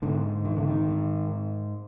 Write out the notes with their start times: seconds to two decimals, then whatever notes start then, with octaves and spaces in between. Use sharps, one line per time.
0.02 G#2 D3
0.45 D#3
0.57 D3
0.68 D#3
0.88 G#2